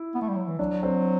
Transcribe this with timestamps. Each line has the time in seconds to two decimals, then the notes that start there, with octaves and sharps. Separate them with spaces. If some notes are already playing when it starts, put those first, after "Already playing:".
Already playing: E4
0.15 B3
0.22 A3
0.29 G3
0.35 F#3
0.47 E3
0.59 F#3 D4
0.83 C4